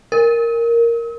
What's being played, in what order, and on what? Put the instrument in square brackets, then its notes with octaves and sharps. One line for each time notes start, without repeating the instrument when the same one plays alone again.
[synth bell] A#4